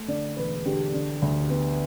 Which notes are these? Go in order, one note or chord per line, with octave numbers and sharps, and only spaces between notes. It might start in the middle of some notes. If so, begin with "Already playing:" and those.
Already playing: A3
D3 D5
E1 B4
D3 G4
D3
D2
B3